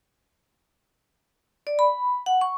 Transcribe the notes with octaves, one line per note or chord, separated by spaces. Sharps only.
D5
B5
F#5
C#6